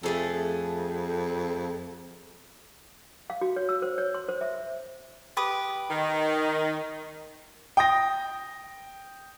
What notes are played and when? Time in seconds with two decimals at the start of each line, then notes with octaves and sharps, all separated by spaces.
0.03 F2 A3 G#4 A4
3.30 F5
3.41 F#4
3.56 C#5
3.69 E6
3.82 C5
3.98 C#5
4.15 C6
4.28 C5
4.41 E5
5.37 G4 B4 D#6
5.90 D#3
7.77 G5 D#6 A#6